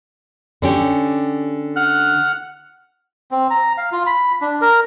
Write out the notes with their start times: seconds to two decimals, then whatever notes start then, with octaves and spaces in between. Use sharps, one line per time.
0.62 D3 C#4 G4
1.76 F#5 F6 F#6
3.31 C4
3.50 A#5
3.78 F5
3.92 F4
4.06 B5
4.41 D4
4.62 A#4